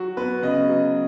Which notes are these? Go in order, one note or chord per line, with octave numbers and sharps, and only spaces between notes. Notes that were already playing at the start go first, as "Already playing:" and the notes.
Already playing: F#3 F#4
B3 B4
C#3 D#5
F#3